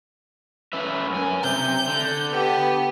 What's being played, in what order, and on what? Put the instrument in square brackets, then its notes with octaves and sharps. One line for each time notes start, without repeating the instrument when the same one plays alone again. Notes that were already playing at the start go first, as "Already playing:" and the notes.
[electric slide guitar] C#4 B4 E5
F#2 G#5
[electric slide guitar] C3 [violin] G6
[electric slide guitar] D3
[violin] B3 G4